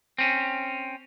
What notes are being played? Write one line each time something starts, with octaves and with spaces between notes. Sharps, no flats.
C4 C#4